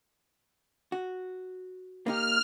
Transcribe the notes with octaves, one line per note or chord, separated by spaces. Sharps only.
F#4
A#3 D#4 G4 F6